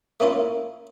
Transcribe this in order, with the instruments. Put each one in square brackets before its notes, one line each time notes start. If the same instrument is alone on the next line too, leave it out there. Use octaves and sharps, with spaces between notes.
[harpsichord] A3 A#3 C#4 E4 F4